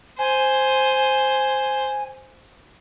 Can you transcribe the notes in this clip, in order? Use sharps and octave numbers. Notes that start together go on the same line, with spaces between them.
C5 G#5